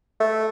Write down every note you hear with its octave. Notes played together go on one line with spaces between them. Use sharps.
A3